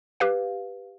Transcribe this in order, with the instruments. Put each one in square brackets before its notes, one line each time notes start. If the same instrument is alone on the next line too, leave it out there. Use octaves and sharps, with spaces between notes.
[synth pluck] G4 B4 F5